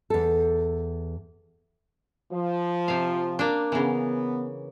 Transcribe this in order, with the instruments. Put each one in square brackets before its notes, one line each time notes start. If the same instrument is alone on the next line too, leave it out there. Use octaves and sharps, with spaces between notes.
[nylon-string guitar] E2 A4
[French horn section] F3
[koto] C3 F5
A#3 D4
[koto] C#3 E3 [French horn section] B3